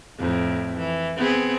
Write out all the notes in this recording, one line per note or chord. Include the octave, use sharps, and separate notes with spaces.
F2 A2
E3
B3 C4 G#4